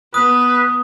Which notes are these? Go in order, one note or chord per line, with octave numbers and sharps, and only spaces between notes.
B3 B4 D#6